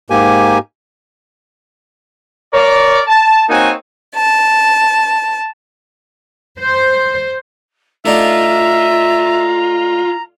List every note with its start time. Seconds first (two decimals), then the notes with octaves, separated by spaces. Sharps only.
0.10 G#2 A#3 G4 G#5
2.54 A#4 C#5 D5
3.07 A5
3.50 A#3 C4 D#4 F#4 C#5 G#5
4.14 A5
6.59 C5
8.06 A3 D4 D#4 F4 E5 A#5